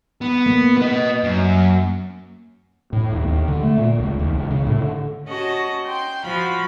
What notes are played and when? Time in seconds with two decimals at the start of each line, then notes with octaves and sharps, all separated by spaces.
0.21 B3
0.46 A#3
0.78 B4 D#5
1.23 F#2
2.93 A2
3.12 D#2
3.27 D#2
3.48 D3
3.63 A3
3.78 A#2
4.00 C#2
4.19 D#2
4.34 C#2
4.51 C#3
4.67 A2
4.80 D3
5.27 C#4 F#4 D#5 A5
5.86 G5 C6 G6
6.24 F3 F#4 F5 B5